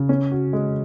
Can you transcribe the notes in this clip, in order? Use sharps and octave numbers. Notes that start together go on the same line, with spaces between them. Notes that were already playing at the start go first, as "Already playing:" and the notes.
Already playing: C#3
C#4
F#4
G#3